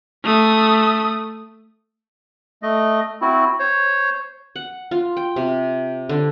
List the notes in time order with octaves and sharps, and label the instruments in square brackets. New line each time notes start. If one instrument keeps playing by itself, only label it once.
[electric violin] A3 D#6
[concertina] A3 D#5
C4 E4 F#4
C5 C#5
[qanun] F#5
F4
G5
C3
D3